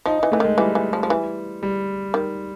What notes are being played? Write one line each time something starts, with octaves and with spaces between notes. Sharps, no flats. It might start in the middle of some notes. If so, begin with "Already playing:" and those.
F3 D#4
E3 D#4
E3 A3
D#3 G#3
E3 G3
E3
F3
F3
E3
G3
D#3